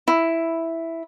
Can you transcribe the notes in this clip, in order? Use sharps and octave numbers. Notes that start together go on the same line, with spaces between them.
E4